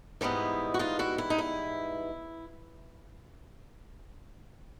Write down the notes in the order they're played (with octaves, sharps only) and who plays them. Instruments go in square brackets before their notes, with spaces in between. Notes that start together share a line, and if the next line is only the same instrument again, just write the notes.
[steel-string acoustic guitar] G#2 E3 G3 B3 D#4 E4
F#4
D#4 F4
E4 F#4
E4
D#4
E4